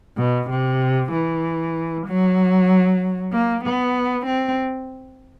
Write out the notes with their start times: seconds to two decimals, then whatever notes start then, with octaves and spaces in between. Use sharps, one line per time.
0.18 B2
0.50 C3
1.12 E3
2.07 F#3
3.32 A#3
3.64 B3
4.26 C4